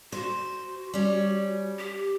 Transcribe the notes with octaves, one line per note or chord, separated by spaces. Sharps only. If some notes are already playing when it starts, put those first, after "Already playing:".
F#4 C5
G3 C#4
G4